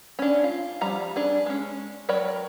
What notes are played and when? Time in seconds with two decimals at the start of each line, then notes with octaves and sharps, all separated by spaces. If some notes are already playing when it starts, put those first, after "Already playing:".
0.19 C#4 D4
0.44 F4
0.81 F3 G3 A#5
1.16 D4 G#4
1.46 G#3 C#4
2.09 F#3 A#4 C#5 D5 G5